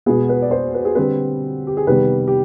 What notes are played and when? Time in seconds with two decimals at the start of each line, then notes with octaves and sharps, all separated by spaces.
0.06 B2 G#3 B3 G#4
0.29 B4
0.42 D5
0.51 C5
0.74 B4
0.85 G#4
0.95 D3 G3 C4 B4
1.67 G4
1.77 G#4
1.87 C3 D#3 G3 B3 B4
2.27 G4